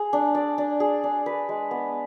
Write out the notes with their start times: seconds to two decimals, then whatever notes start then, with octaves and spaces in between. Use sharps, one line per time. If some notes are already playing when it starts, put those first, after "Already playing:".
Already playing: G#4
0.13 D4
0.35 D5
0.58 D4
0.80 G#4
1.04 D4
1.26 B4
1.49 G#3
1.71 B3